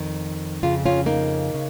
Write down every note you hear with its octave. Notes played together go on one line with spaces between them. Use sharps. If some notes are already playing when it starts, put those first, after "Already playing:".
Already playing: F2 D#3
F2 C#3 F4
C#4 F4
A#3 D#4
C#3